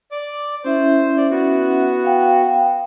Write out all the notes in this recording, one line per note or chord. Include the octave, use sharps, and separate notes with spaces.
D5 D6
C#4 E4 C5 E5
D5
B3 F#4
F5 G5